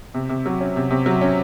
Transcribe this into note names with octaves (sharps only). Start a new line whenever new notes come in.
C3
C3
F#3
C#4
C3
C3
F#3
C#4